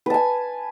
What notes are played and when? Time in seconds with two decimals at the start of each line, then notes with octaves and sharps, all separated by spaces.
0.06 B4
0.10 A5
0.14 G#5